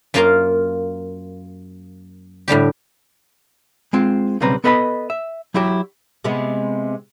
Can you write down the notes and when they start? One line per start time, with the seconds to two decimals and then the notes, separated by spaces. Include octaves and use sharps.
0.14 F#2 A#3 F4 A#4 A#5 C6
2.48 A2 D3 G3 G4
3.93 G#3 C4 F4
4.41 B1 C#3 G3 C4 B4 A#5
4.64 B3 A4 B4 D#5 G#5 B5
5.10 E5
5.54 F#3 E4 F#4 G4
6.24 C3 G#3 B3